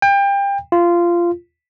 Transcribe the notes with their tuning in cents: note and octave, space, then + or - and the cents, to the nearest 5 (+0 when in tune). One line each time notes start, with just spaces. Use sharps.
G5 +30
F4 -15